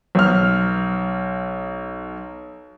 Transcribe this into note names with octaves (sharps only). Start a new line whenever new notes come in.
B1 F6